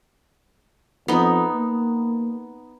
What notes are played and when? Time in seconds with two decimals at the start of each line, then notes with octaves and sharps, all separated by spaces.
1.08 F2 B3 D#4
1.55 A#3